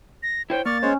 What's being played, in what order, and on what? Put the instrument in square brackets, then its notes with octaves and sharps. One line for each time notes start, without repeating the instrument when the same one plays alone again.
[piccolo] A#6
[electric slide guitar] E4 C5 C#5 [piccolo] G5
[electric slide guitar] A#3 [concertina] D5 C#6 F6 [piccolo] A6
[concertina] G#3 C5 C#5 [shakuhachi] C#4